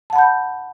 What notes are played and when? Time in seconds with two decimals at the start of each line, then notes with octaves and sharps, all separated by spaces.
0.10 A5
0.13 F#5
0.16 B5
0.18 G6